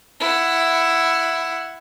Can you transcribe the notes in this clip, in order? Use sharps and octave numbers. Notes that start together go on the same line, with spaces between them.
E4 F#5